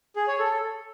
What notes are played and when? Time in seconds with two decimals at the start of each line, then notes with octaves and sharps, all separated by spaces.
0.16 G#4
0.28 C#5
0.39 A4